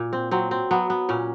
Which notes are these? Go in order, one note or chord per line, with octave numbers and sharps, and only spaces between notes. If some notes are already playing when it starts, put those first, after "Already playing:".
Already playing: A#2
C4
F#3 C4
C4
F#3 B3
B3
A#2 C#4